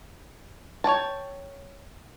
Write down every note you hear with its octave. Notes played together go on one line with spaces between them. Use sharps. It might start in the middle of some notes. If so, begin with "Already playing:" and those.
C#5 D5 G5 A5